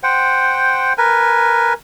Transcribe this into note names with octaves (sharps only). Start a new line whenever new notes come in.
C5 F#5 G5
A#4 B4 G#5